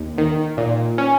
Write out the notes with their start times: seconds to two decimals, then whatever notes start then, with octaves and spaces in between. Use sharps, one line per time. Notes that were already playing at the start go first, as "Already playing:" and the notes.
Already playing: D#2
0.18 D#3
0.57 A#2
0.98 C#4